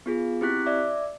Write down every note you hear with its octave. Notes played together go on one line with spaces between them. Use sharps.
B3 F4 G#4
C4 E4 G4 D6 F#6 B6
D5 E5 D6